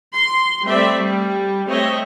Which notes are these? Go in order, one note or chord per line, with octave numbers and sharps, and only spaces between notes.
C6
G3 A3 C4 D5 E5
G3
A3 C4 C#5 D#5 E5